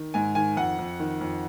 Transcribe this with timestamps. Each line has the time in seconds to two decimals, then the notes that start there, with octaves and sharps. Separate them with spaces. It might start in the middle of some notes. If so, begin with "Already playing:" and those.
Already playing: D#3
0.14 G#2 G#5
0.35 D#3 G#5
0.57 F2 F#5
0.79 F2
1.00 D#3
1.21 F2